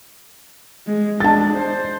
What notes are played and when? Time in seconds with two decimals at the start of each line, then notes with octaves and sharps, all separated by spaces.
0.87 G#3
1.20 G#3 D4 A5 A6
1.57 C5